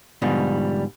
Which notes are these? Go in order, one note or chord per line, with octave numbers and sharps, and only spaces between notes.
G#2 B2 D3 F3 G3